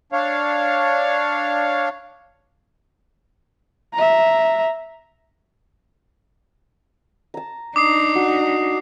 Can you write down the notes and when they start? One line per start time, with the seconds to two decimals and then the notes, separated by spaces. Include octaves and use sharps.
0.12 D4 C#5 F5
3.94 E5 A#5
7.34 A5 A#5
7.76 D4 D#4 D6 D#6 C7
8.15 F#4